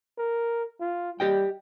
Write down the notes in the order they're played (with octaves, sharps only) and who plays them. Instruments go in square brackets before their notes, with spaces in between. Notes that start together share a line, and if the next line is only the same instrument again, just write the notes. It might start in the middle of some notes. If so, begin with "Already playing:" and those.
[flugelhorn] A#4
F4
[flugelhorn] G3 [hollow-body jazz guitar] G4 D#5 G5